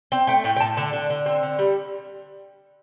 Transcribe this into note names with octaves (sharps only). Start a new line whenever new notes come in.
C4 G5
A3 G5
A2 G5
G5
A2 A5
D3 A5
D3
D3
C4
D3
G3